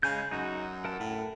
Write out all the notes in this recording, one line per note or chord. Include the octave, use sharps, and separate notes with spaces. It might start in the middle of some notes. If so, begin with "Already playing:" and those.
C#3 G#3 G#5 G6
F#2 D#4 F#4
A#4 F#5 A5
A2